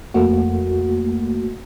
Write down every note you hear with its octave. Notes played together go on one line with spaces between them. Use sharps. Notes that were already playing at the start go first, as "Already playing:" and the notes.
F2 A3 A#3 F#4